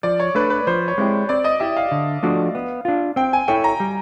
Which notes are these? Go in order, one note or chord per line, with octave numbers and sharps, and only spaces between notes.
F3 D5
C#5
A3 D4 B4
B4
F3 C5
C#5
G#3 C4 E4 G4
C4 D5
D#5
E4 G4 E5
F5
D3
F3 A3 D4 F#4
B3
D4 F4
C4 G5
G#5
E4 A4 C#5 G5
A#5
G3